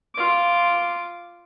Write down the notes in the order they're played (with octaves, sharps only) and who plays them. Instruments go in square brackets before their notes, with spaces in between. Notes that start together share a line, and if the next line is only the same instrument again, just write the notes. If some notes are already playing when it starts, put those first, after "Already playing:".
[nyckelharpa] F4 D6